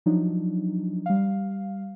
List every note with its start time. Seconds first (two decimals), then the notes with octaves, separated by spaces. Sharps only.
0.06 F3 F#3 D4 D#4
1.06 G3 F5